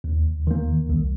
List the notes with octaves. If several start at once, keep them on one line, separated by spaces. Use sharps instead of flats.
D#2
D#3 A#3
C2